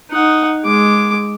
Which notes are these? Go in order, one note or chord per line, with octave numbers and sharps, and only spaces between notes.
D#4 F#5
G#3 D6